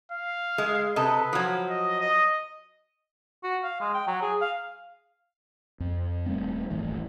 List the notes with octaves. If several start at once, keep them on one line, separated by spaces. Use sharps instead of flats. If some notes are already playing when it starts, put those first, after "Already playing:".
F5
G#3
C3 A4 B4 D#5
F3 F#3
D#5
D#5
F#4
F5
G#3
G5
F#3
G#4
F5
F2
D#1 G3 A3 C4
D#1 G#1 E3 A3